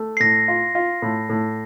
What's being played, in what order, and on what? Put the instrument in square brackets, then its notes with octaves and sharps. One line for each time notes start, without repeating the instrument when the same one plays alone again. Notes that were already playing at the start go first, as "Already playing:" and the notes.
Already playing: [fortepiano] A3
[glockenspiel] C7
[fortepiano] A2 [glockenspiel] A#6
[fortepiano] F4
F4
A2
A2